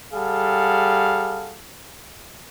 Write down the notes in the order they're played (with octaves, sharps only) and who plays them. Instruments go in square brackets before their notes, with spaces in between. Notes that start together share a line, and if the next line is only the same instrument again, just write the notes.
[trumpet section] G3 G#4 A4 F5 F#5